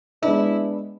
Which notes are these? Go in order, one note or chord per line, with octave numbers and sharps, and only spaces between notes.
G#3 B3 D4 E4